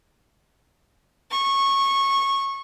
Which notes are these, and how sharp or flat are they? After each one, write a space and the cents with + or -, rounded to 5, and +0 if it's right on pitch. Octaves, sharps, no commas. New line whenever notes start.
C#6 -15